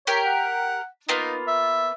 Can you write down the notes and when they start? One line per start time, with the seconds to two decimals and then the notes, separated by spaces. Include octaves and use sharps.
0.07 G4 A#4 C#5
0.26 F#5
1.09 A#3 B3 D#4 F4
1.48 E5